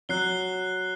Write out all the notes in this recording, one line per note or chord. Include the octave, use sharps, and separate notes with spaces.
F#3 F#6 C7 G7